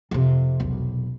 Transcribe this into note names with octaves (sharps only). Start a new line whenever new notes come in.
F2 C3
E1 B1